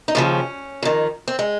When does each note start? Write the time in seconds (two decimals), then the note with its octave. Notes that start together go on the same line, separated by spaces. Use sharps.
0.08 D#4
0.15 D#2 C#3 F3 C#4
0.83 F2 D#3
1.28 C4
1.39 G#3